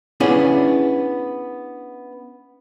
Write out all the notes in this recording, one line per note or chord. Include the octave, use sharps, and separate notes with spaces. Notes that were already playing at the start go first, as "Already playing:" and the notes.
B3 C#4 D4 E4 G#4 G#5